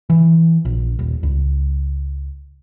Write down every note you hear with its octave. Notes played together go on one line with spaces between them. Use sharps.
E3
A#1
D#1
C#2